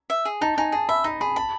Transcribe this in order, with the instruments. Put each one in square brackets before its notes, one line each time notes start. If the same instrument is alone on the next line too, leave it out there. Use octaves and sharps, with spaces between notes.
[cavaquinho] E5
G#4
[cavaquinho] D#4 [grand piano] A5
[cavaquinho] D#4 [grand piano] G#5
[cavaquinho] G#4 [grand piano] A5
[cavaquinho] E5 [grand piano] B5
[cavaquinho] D#4 [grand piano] B5
[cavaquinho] G#4 [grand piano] B5
[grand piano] A5 [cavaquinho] B5